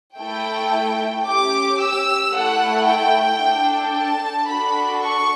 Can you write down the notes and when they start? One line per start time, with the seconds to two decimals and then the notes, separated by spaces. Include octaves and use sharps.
0.18 A3 E4 A4 G5
1.26 C#4 G4 D6
1.80 E6
2.33 A3 E4 A4 F#5
2.87 G5
3.40 D4 A4
3.94 A5
4.48 D4 F#4 A4 B5
5.02 C#6